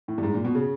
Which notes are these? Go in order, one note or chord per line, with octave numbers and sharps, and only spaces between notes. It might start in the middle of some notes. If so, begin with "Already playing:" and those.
A2
G2
G#2
A#2
B2
C#3